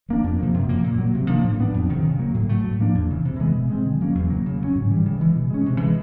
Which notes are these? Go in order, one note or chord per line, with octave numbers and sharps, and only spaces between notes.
F3 A#3 D4
F2
C3 F3 A#3
F#2
C#3 F3 A#3
A#2
F#3 A#3
C3
F3 A#3 D4
A2
F#3 B3 D4
F2
C3 D#3
C#3
F#3 A#3
A2
F#3 A3
A2
F3 A#3 D4
E2
C#3 E3
C3
E3 G#3 B3
B2
G#3 C4
D3
F#3 A#3 C#4
E2
C#3 F#3 A#3
C#3
F#3 A3 C#4
G#2
E3 G3
C#3
E3 G#3
B2
G#3 C#4
C3
E3 G#3